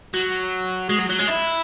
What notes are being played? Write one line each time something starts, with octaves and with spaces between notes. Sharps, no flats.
F#3
G#3
F#3
F#3
G#3
E4